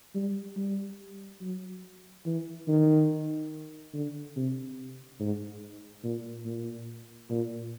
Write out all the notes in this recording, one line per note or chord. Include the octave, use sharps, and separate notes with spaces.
G3
G3
F#3
E3
D#3
D3
C3
G#2
A#2
A#2
A#2